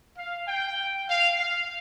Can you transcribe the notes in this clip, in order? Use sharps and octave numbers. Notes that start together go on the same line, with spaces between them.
F5
G5
F5
F5